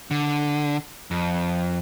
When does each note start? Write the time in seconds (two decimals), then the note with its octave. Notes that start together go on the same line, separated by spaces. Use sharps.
0.11 D3
1.11 F2